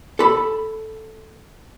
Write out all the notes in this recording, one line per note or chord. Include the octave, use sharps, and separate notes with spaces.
A4 B5